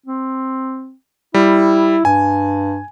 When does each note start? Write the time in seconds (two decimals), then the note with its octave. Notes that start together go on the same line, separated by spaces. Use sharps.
0.06 C4
1.34 G3 E4
2.05 G2 G#5